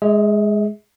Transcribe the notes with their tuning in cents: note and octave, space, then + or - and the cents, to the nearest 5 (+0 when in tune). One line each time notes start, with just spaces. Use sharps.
G#3 +0 G#4 +0 E5 -40